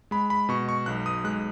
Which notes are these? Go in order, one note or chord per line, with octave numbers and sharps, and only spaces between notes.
G#3 B5
B5
B2 C#6
C#6
B1 F#6
D#6
G#3 F#6